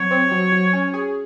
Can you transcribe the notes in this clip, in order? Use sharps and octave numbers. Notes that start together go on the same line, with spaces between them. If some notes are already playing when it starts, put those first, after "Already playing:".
Already playing: C3 F#3 C#5
C4
F#3
F#3
C#4
G#4